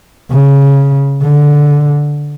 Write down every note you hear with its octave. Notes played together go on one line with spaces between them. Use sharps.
C#3
D3